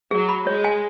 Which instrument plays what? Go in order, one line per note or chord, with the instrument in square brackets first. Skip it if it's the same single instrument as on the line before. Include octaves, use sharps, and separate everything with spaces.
[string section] F#3 [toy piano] G#4
[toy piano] B5
[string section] G#3 [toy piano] C#5
[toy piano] G#5